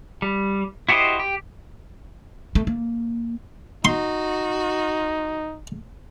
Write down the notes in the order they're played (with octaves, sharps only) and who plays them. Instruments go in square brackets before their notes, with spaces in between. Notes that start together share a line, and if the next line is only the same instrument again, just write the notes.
[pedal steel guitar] G3
E4 F#4 G4 C5 D#5
G4
[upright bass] A3
A#3
[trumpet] D#4 [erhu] F#4 [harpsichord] C6